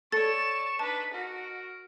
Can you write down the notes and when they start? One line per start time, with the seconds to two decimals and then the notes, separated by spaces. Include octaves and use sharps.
0.12 A4 C#5 D5 C#6 A6 E7
0.79 D4 D#4 B4 A5
1.14 F#4 A#4